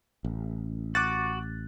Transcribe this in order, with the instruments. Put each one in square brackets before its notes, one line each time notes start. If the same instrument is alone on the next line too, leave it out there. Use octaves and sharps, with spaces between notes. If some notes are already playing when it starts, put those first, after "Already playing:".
[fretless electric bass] A1
[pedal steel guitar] F#4 [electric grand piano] D6 F#6 A6